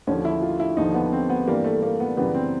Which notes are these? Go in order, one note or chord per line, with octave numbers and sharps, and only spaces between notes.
D#2 D3 F3 C#4
E4
F4
E4
D#2 D3 F3 D#4
B3
C4
B3
G2 E3 G3 A#3
A3
A#3
B3
F#2 C#3 E3 G3 B3
C4